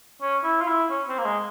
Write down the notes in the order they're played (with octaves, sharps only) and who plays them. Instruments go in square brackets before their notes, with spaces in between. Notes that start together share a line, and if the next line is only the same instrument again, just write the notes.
[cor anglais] C#4
E4
F4
E4
C#4
C4
A#3
G#3